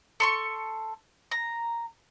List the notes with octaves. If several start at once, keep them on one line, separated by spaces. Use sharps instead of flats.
A4 C6 C#6
A#5